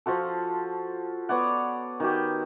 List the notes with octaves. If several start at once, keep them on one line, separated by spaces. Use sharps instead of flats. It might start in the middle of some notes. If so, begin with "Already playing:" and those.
F3 F4 F#4 A4
B3 C#5 D5 F#5
D#3 F#4 G4